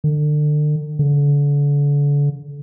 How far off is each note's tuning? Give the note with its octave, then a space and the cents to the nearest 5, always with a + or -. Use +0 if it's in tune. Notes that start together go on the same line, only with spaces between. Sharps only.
D3 +35
D3 -35